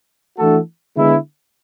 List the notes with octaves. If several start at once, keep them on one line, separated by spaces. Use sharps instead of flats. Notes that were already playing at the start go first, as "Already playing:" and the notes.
E3 A3 D4 F#4 A4
D3 G#3 B3 E4